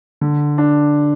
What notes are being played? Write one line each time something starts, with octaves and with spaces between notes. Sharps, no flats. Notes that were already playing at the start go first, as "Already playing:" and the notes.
D3
D4